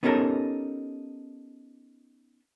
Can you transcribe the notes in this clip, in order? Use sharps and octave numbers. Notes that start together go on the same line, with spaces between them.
B3 C#4 D#4 G4 A4 A#4